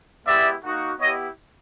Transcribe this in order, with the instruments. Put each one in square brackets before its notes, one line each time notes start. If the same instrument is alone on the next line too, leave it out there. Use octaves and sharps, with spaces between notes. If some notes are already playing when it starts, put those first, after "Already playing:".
[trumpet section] G#3 B3 E4 G4 D5 E5
A#3 D#4 F#4
B3 E4 G4 C#5 D#5